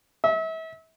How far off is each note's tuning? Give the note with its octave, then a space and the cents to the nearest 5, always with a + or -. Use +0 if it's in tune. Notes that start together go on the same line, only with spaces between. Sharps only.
E5 -35